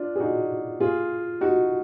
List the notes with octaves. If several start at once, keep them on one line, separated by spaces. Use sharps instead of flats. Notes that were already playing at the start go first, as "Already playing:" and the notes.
Already playing: D4 F4
G#4
D#4 F#4
F4 G#4
D#4 F#4